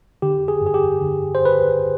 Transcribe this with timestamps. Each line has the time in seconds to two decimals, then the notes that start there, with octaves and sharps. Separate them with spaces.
0.22 D3 G4
0.48 G#4
0.61 G2
0.67 G#4
0.74 G4
1.01 D3
1.35 C5
1.45 B4